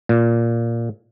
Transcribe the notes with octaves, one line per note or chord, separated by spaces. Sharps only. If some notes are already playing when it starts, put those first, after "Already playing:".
A#2